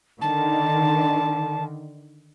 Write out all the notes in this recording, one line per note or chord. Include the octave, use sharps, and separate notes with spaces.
D3 D#3 A5